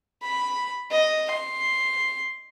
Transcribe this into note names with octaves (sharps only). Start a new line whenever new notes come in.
B5
D#5
C6